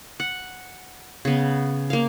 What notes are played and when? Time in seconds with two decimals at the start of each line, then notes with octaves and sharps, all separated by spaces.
0.20 F#5
1.25 C#3 B3
1.90 A#3 F5